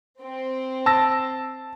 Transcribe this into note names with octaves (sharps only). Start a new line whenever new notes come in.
C4
A5 E6 A#6